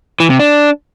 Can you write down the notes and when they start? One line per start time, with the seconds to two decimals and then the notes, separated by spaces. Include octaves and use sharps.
0.20 E3
0.30 C3
0.39 D4